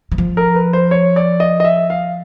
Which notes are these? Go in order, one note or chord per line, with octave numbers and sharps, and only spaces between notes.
E3
F3
A#4
B4
C5
C#5
D5
D#5
D#5
E5
F5